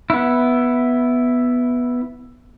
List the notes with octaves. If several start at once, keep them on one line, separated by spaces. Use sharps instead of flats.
B3 E4